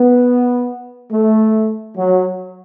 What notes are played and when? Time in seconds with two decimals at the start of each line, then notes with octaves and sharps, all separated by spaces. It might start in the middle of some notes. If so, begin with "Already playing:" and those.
Already playing: B3
1.11 A3
1.96 F#3